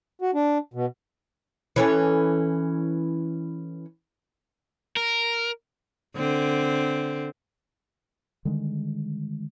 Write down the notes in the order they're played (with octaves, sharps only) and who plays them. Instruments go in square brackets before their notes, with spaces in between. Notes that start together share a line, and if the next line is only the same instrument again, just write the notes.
[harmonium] F#4
D4
B2
[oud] E3 C#4 A4
[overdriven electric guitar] A#4
[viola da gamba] D3 C4
[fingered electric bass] D3 D#3 G3 G#3